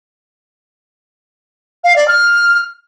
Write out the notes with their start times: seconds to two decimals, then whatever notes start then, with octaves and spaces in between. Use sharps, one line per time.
1.84 F5
1.96 D5
2.08 F6